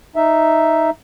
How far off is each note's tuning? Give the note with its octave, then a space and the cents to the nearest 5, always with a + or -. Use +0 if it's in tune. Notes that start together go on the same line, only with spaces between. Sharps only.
D#4 +0 E5 +0